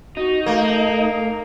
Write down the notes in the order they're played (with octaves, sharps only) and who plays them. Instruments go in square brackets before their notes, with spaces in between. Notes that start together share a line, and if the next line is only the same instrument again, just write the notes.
[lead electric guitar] D#4 [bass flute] F#4
[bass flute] A3 [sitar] A#3